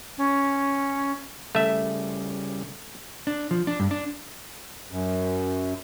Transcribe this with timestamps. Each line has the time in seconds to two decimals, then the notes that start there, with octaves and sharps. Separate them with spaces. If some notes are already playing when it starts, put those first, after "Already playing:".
0.18 C#4
1.55 C#3 G3 A3 E5
3.27 D4
3.51 F3
3.67 D4
3.80 G2
3.91 D4
4.91 F#2